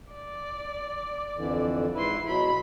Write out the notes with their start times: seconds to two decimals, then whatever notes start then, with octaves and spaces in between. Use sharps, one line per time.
0.12 D5
1.36 F2 D3 E3
1.94 G#2 E4 B4 C6
2.27 B2 F#3 B5